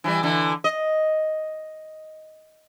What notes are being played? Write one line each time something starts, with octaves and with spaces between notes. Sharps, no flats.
E3 F3 G3
D3 E3
D#5